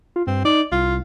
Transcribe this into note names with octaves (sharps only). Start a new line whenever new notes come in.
F4
G2 C4
D#4 D5
C2 F4